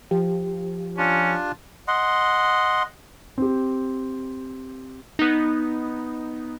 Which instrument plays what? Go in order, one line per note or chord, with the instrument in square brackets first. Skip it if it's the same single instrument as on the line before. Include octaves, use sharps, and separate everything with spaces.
[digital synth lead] F3 [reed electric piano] G4
[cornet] C#4 [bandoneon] D4 F4
[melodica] D#5 F#5 C6
[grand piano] C4 G4
[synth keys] B3 D#4